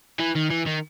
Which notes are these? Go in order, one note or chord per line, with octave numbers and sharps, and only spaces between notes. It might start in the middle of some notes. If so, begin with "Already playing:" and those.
E3
D#3
E3
D#3